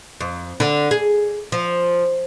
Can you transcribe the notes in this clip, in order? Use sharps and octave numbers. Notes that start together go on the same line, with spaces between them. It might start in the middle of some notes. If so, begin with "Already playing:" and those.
F2
D3
G#4
F3